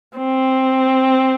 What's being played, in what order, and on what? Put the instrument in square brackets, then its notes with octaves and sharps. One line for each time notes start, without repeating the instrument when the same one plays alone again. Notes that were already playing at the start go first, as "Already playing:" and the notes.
[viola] C4